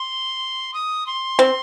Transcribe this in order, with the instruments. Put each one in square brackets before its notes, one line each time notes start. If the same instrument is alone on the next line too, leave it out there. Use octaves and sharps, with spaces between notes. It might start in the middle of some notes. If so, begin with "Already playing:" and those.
Already playing: [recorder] C6
D#6
C6
[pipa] C4